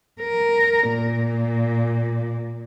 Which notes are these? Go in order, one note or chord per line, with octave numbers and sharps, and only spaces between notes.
A#4
A#2